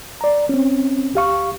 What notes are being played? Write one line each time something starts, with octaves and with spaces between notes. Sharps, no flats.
D5 A#5
C4 C#4
D2 G4 F5 C#6